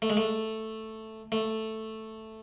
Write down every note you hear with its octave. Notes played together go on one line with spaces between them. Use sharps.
A3
G#3
A3
A3